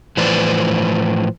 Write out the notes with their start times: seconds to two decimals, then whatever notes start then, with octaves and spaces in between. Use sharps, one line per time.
0.17 A2 E3 F3 B4 C5 D5